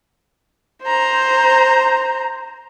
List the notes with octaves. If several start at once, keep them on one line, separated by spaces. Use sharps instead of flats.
C5 A#5